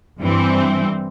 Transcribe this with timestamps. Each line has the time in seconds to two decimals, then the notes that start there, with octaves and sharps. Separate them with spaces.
0.19 G2 E3 G3 C4